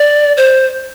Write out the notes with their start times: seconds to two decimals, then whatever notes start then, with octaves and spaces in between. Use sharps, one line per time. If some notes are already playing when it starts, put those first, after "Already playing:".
Already playing: D5
0.37 C5